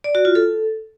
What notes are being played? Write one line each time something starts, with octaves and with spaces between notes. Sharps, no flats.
D5
F#4
F4
A4